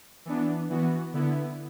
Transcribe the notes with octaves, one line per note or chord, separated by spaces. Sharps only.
E3 B3 D4
E3 B3 F#4
D3 B3 E4